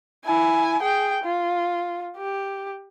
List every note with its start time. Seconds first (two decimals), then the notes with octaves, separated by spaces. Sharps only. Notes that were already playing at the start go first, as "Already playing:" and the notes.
0.25 E4 G#5
0.82 G#4 G5
1.24 F4
2.18 G4